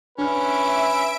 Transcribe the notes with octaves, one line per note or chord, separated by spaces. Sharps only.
C#4 D4 B4 E5 F6 D7